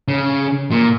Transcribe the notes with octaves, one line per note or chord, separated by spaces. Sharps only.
C#3
A#2